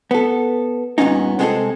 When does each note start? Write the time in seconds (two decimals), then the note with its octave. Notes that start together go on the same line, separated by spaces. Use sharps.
0.11 B3 A4
0.98 G2 A#2 C#3 B3 C#4 D#4
1.39 C3 G#3 B3 C4 G#4 A4